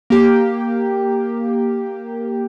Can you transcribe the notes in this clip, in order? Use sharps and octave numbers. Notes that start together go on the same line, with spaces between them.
A#3 G4